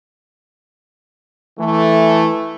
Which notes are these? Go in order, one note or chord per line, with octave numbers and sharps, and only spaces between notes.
E3 A3